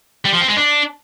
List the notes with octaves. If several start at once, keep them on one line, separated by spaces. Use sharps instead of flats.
G3
F3
C4
G#3
D4